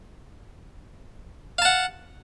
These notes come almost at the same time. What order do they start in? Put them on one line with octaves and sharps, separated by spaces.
F5 A5 F#5